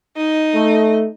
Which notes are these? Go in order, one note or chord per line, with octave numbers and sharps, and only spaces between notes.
D#4 D#5
A3